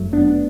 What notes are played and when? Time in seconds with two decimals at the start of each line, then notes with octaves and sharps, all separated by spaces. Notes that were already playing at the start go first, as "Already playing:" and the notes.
Already playing: G1 F#2 F#3 A3
0.13 B3 D4